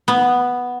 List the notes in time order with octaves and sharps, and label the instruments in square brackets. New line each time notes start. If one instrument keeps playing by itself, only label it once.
[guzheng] B3